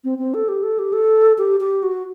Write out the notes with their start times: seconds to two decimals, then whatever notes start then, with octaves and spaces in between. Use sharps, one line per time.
0.04 C4
0.18 C4
0.34 A4
0.48 G4
0.63 A4
0.79 G4
0.93 A4
1.38 G4
1.60 G4
1.83 F#4